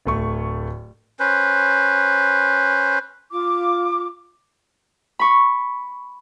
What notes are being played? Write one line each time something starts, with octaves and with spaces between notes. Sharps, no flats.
D1 A3 C#6
C#4 B4 C5
F4 D6
B5 C#6